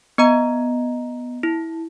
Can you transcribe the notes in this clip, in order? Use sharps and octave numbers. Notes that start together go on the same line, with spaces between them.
B3 D#5 A#5
E4